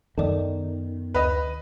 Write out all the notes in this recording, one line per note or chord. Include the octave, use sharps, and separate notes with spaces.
F#2 D#3 B3 A4 D5 D#5
D2 B4 D#5